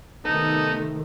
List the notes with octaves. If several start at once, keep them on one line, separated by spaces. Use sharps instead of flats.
C3 D#3 A3 B3 D#4 A4